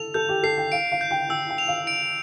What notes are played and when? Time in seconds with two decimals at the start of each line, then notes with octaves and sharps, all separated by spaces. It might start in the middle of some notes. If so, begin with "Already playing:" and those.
Already playing: A4 F7
0.14 A4 G6
0.29 G4
0.43 A4 C7
0.58 G5
0.72 F5 D7
0.92 F5
1.01 G6
1.11 G5
1.29 G5 E6
1.49 G5
1.58 F7
1.68 F5
1.87 D7